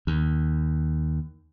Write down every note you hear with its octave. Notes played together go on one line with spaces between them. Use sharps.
D#2